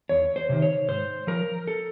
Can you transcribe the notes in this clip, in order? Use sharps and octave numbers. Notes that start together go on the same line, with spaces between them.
E2 C#5
C5
C3 D#3
C#5
G#2 C5
F3 A#4
A4